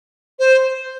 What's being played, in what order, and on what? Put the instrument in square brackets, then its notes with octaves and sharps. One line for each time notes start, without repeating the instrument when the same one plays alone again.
[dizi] C5